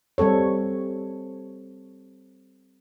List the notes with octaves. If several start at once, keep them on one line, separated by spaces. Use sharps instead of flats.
G3 C4 A4 C#5